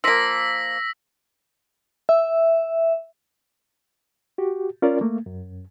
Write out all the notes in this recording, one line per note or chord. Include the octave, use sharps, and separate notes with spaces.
F3 A#3 E6 A#6 B6
E5
F#4 G4
C#4 F4 A#4 D5
A3 A#3
F#2